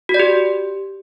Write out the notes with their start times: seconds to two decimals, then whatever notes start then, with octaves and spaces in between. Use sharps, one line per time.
0.09 F#4
0.14 D5
0.20 G4